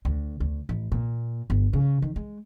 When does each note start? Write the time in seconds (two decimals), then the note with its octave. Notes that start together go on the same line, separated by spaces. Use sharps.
0.05 D2
0.40 D2
0.69 A1
0.92 A#2
1.50 G1
1.73 C#3
2.02 D#3
2.16 G#3